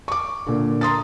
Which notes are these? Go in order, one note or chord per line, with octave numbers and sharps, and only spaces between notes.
C#6 D6
A#2 D3
A#5 C6 D#6 A6